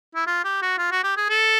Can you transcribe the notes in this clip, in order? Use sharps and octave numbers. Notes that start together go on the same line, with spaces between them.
E4
F4
G4
F#4
F4
F#4
G4
G#4
A4